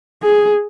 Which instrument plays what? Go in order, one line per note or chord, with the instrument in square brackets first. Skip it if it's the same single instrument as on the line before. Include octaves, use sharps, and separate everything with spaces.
[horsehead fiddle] G#4